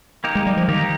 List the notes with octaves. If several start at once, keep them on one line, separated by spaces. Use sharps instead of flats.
A#3 D#4 G4 A#4
G#3
G3
F3
D#3 A#3 D#4 G4 A#4